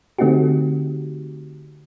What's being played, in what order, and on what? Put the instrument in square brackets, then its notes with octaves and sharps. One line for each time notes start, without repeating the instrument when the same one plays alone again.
[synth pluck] D3 A3 C4 D#4 F#4 G4